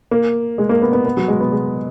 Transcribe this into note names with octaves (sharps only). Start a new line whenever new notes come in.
A#3
G#3
A#3
B3
B3
B3
F#3
G#3
B3
G#3